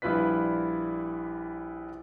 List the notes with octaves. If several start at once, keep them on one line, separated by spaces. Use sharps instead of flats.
A#1 G3 E4 F4 B4 B6